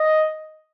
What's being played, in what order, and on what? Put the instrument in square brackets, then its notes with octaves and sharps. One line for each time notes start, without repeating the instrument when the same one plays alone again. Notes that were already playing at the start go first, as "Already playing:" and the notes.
Already playing: [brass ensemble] D#5